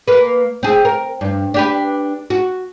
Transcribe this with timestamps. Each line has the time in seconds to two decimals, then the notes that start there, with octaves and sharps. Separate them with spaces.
0.08 A#3 B4
0.63 C4 G#4
0.85 A#4
1.21 G2
1.54 D4 G4 B4
2.30 F#4